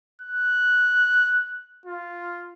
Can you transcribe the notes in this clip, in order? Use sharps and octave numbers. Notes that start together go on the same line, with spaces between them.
F#6
F4